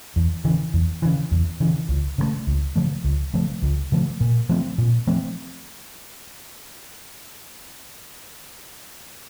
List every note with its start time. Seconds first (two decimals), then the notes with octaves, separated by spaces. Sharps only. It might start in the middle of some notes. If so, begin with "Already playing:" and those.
0.16 E2
0.44 C#3 E3
0.74 E2
1.02 C#3 E3
1.31 E2
1.60 C#3 E3
1.89 C#2
2.18 C#3 F3 A3
2.47 C#2
2.76 C#3 F3 A3
3.04 C#2
3.34 C#3 F3 A3
3.62 C#2
3.92 C#3 F3 A3
4.21 A#2
4.49 F3 A3 C4
4.78 A#2
5.07 F3 A3 C4